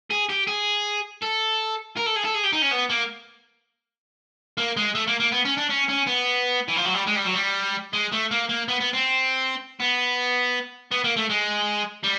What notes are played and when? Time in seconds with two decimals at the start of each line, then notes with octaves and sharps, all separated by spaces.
0.10 G#4
0.29 G4
0.47 G#4
1.23 A4
1.97 A#4
2.06 A4
2.16 G#4
2.24 A4
2.34 G#4
2.43 G4
2.52 D#4
2.62 C#4
2.71 B3
2.90 A#3
4.57 A#3
4.77 G#3
4.95 A3
5.08 A#3
5.20 A#3
5.32 B3
5.45 C#4
5.57 D4
5.69 C#4
5.88 C#4
6.06 B3
6.68 E3
6.77 F3
6.85 F#3
6.94 G3
7.06 G#3
7.16 G3
7.25 F#3
7.34 G3
7.93 G#3
8.12 A3
8.31 A#3
8.49 A#3
8.68 B3
8.80 B3
8.93 C4
9.80 B3
10.92 B3
11.04 A#3
11.16 A3
11.29 G#3
12.03 G3